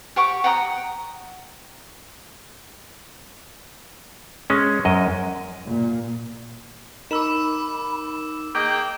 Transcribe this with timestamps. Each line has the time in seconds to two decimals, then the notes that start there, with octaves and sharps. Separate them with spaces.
0.16 G4 F#5 C#6 D6
0.44 F#5 G5 A#5 D#6
4.50 G#3 C#4
4.85 F#2 D#5
5.66 A#2
7.11 D#4 A#4 B5 D6 E6 E7
8.55 A#3 G#4 D#5 G5